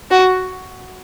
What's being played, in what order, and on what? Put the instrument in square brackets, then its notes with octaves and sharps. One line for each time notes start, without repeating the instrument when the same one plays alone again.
[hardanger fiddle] F#4